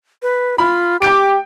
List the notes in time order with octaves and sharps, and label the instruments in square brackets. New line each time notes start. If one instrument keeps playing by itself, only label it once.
[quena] B4
[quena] F4 [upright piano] B5
[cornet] G4 [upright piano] G5 G6 D7 [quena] D6